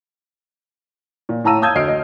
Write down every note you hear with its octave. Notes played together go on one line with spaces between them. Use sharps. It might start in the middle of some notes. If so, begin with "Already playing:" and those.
A#2
A2 A5 A#5 E6 D#7
A5 D#6 E6 G6 G#6
D2 D#5 F6 C7 D7
D#5